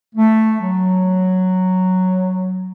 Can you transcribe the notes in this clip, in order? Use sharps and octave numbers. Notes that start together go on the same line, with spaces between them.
A3
F#3